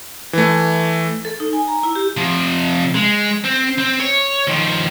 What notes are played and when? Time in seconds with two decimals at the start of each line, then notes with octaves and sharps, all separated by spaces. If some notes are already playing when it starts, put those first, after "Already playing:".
0.33 E3 A3
1.25 A4
1.40 D#4
1.53 G#5
1.67 A#5
1.83 E4
1.95 G4
2.17 C3 F3
2.95 G#3
3.45 C4
3.78 C4
4.00 C#5
4.48 D#3 F3